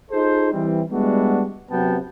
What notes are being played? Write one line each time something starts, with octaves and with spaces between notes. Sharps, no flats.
D#4 F4 G#4 A4 C5
E3 G3 C4
G3 G#3 B3 D4 E4 F#4
F#2 C3 F#3 B3 G5 A5